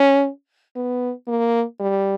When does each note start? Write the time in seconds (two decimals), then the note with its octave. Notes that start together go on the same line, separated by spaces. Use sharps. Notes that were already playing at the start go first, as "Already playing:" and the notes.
Already playing: C#4
0.76 B3
1.28 A#3
1.80 G3